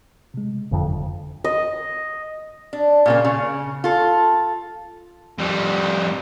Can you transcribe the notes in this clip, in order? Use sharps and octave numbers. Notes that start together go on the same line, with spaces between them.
C3 G#3
F#1 F2 D3
D#5
D4
A#2 C#3 A#3
C#3
F4 A4
F2 G3